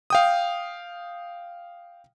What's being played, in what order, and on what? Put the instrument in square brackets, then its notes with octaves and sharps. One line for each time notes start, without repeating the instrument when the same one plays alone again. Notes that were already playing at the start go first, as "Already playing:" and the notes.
[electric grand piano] F5 G5 D#6